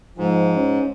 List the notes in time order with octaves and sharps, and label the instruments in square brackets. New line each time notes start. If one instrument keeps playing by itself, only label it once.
[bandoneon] G#2 [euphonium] F3
[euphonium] C#4